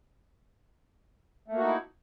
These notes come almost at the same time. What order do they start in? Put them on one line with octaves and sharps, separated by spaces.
A3 A#3 F#4 D#4 E4